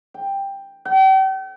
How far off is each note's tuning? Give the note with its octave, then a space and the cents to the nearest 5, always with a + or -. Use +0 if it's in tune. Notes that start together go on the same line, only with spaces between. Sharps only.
G5 +5
G5 -40